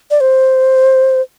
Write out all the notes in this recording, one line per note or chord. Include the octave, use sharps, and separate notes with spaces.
D5
C5